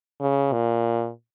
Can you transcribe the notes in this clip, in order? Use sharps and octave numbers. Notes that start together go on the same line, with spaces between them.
C#3
A#2